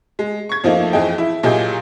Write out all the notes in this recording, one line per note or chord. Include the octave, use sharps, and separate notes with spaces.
G#3
C#6 G#6
F2 F3 A3 A#3 D#4
F2 E3 G#4 D#5 G5
E4
A#2 F#3 G4 G#4 D#5 G6